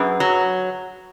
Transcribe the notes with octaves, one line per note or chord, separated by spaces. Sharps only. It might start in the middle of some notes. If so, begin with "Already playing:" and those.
Already playing: F#2 G#4 B4
F#3